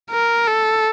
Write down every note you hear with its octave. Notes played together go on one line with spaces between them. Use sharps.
A#4
A4